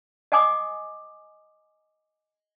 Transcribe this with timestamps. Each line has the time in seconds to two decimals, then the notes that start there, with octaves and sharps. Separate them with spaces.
0.32 D#5 F#5 G#5 D6 D#6